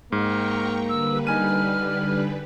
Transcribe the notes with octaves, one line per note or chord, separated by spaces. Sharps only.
G#2 A#3 G5 A#5 C#6 F6
D3 G3 B4 E6
D#4 G#5 F6 D#7